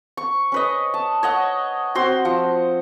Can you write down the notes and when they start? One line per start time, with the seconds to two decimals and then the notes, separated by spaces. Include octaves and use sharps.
0.17 C#6
0.52 C#4 B4 D#5
0.94 A5
1.23 C#5 D#5 F#5
1.95 C4 F#4 C6
2.25 F3 F#5